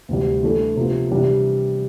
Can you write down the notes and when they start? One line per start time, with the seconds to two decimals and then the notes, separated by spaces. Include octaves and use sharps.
0.09 D2 C3 E3 G3
0.43 E3 A3 D4 A4
0.76 C3 F3 B3
1.11 C3 E3 G3 D4